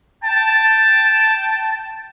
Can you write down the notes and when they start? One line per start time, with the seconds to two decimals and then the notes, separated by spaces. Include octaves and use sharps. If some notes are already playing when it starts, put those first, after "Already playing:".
0.23 G5 A5